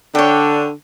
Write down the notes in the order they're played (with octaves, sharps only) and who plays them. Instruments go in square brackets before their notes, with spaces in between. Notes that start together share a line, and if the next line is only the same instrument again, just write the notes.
[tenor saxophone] D3 [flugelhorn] D4 [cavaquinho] C#5 G5